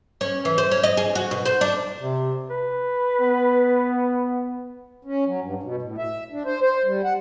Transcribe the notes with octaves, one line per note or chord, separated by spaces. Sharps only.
C#4
E3
C5
C#4
D#5
G#4
F#4
B2
C5
D4
C3
B4
B3
C#4
F#3
G2
B2
A2
E5
D4
C5
C5
G3
F#5